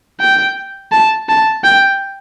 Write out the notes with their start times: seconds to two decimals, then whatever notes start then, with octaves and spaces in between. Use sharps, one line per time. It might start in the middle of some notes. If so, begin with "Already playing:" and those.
0.20 G5
0.92 A5
1.29 A5
1.64 G5